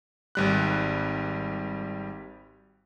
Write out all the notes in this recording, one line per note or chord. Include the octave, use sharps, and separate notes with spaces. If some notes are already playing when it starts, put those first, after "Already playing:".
G#1 G3 F#6